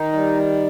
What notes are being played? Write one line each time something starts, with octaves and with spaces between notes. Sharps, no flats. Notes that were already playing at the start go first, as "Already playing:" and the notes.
Already playing: D#3 D#4
G3